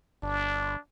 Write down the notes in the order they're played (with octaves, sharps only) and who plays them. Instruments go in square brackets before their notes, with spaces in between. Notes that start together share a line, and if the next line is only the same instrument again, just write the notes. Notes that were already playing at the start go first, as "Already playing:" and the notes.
[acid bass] G1 [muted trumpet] D4